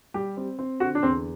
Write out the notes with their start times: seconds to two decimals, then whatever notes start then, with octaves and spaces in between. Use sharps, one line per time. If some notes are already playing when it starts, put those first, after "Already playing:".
0.14 G3 G4
0.37 C4
0.59 C4
0.80 D3 F#4
0.95 D4
1.03 E2 C4